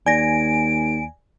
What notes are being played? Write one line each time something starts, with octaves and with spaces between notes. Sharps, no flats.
D#2 D5 G#5 A#6 D7